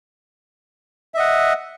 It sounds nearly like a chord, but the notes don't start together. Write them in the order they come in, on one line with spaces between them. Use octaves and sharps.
E5 D#5 F#5